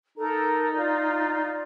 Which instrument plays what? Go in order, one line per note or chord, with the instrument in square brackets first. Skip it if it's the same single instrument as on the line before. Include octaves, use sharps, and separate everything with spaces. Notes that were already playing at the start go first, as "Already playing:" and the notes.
[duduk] D#4 [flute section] A4 A#4 A#5
[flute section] F4 D5